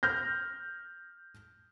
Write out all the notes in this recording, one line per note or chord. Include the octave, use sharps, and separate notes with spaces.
F6 G6 A#6